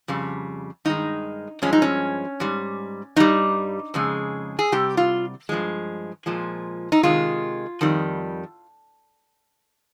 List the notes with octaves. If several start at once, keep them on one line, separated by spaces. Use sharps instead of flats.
F2 C#3 G3
G2 D#3 G#3 D#4
G2 F3 G#3 C#4
D#4
C#4
G#2 G3
G2 G3 D#4
F2 C#3 G#3
G#4
C3 G3 G4
F4
G2 F3 G#3
A#2 F3 G#3
D#4
C3 D#3 G#3 F4
F2 D#3 G3